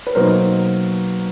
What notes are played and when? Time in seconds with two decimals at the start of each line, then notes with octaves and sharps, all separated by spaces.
0.07 B4
0.15 B2 F#3 A#3 D#4 A#4 C5